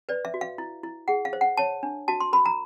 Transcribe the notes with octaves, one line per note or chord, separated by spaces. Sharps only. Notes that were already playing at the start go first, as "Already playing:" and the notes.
B4 D5
E5
F#4
F5
E4
E4
G#4 F#5
F5
C5
F#5
C#5 A5
D4
F#4 A5
C6
A#4 B5
A#5